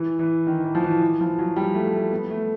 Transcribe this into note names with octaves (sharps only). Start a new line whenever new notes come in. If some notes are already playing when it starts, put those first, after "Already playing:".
Already playing: E3
E3
D#3
E3
F3
E3
E3
F3
F#3
G3
A3
A3
B3
A3